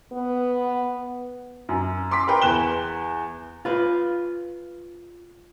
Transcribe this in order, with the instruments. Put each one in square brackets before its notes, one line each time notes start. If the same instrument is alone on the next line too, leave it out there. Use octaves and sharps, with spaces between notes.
[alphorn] B3
[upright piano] F#2
C6 D6 B6
A#4 B4 G5 C6
E2 F#6 E7 G7
[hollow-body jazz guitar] F4 B4